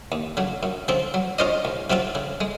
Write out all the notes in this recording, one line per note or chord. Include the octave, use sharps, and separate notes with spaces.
D#2
C#3 F#3
F#2
C#3 F3 C4
F#3
C#4 F4 C5 D#5
C2
C3 F#3 C4 F4
C#3
G#3